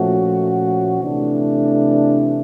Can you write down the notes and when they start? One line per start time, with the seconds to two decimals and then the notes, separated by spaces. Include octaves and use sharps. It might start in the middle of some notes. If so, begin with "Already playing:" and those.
Already playing: A#2 F3 A3 C#4 F#4
1.02 C3 E3 A3 D4